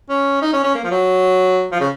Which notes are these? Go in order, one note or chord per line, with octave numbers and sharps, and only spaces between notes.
C#4
D#4
C#4
C#4
A#3
F3
F#3
F3
C#3